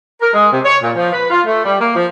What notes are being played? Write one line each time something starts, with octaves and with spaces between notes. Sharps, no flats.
A#4
G#3
C3
C#5
A#2
F3
B4
F4
A3
G3
A#3
F3